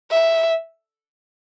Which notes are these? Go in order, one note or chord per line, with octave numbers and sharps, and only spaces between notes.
E5